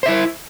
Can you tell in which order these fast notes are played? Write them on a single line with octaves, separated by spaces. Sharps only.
C5 E5 E4